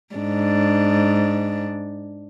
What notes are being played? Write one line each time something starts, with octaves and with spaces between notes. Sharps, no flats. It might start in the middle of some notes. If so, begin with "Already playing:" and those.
G#2 D4